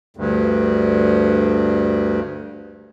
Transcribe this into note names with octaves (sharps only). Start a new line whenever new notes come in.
D2 G2